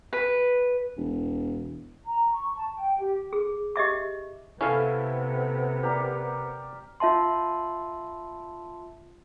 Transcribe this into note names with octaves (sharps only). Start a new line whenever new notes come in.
B4
E1
A#5
C#6
A5
G5
G4
G#4
G4 D#5 E5 D6
C3 B3 C#4 E4 A4 F5 G#5
G4 A#4 D5
F4 E5 A5 C6